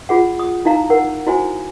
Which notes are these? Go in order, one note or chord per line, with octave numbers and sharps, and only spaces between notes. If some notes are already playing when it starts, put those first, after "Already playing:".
F4 G#4 F#5
D#6
D#4 E4 F5 A#5
A#4 F#5
E4 F#4 C5 G#5